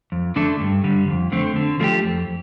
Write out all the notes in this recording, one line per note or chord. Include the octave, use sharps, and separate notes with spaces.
F2
D3 A3 D4 A4
G2
D3 G3
F2
D3 A3 C4
D3
F3 A3 D4 G4
F2